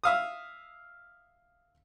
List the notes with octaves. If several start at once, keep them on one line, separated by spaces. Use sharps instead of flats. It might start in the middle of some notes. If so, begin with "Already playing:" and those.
E5 F5 D#6